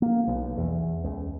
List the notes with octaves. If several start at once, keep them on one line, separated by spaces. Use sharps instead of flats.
A#3
B1
E2
C#2